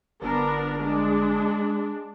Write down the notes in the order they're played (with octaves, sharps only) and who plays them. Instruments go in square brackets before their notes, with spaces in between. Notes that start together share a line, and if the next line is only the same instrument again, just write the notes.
[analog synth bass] G1 [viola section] B3 D4 A#4
[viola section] G#3 D4